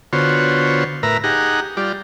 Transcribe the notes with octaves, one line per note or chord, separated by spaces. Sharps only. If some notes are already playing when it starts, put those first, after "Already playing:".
D3 B3 F4 F#4 C5 C#5
A2 A#4 B4 E5 A#5
D#4 G4 G#4 F#5 A#5
G3 F4 G4 D5